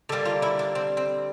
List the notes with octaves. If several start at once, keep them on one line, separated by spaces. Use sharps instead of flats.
D3 G3 A#3 A4
F4
E4
D4
C4
C4